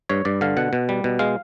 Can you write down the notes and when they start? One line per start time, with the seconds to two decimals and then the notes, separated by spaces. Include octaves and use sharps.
0.10 G2 C#5
0.25 G2 D5
0.41 D3 F5
0.57 B2 F#5
0.73 B2
0.89 G3
1.04 B2
1.19 G#3 F5